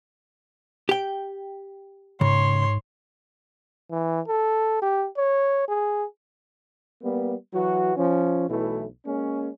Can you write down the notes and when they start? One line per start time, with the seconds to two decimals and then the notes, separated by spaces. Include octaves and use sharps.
0.89 G4 G5
2.21 G#2 C#3 C#5 C6
3.91 E3
4.28 A4
4.82 G4
5.17 C#5
5.68 G#4
7.03 G3 A#3 B3
7.53 E3 F#3 F#4
7.97 F3 C#4
8.49 B1 B2 E3 A3 E4
9.06 G#3 A#3 C#4